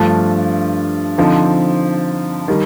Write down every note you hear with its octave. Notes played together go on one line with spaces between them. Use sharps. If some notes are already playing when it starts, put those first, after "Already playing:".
Already playing: G2 F3 A3 D4 F4
D3 F3 C4 D#4
D#3 G3